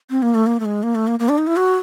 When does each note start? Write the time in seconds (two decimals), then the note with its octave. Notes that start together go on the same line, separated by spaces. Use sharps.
0.10 C4
0.22 A#3
0.35 A3
0.46 A#3
0.60 A3
0.65 G#3
0.83 A#3
0.95 A3
1.07 A#3
1.20 A#3
1.29 D4
1.38 D#4
1.47 E4
1.57 F#4